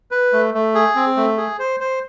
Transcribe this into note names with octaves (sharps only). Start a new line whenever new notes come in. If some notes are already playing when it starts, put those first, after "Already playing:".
B4
A3
A3
G#4
C4
A3
G#4
C5
C5